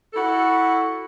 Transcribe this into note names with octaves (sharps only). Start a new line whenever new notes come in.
E4 F#4 A4